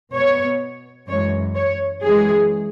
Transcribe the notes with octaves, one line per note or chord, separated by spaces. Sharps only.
B2 B3 C#5
F#2 E3 G#3 C#5
C#5
F#2 E3 G#3 C#4 G#4